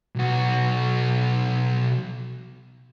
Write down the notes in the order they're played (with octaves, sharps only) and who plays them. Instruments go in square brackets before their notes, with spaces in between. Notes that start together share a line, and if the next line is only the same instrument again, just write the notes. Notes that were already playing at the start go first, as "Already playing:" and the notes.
[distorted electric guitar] B1 F#4